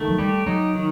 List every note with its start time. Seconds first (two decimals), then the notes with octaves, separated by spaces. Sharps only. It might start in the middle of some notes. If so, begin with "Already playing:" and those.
Already playing: D#3 A3
0.08 F#3
0.18 G3 G4
0.46 F#3 D#4
0.75 D#3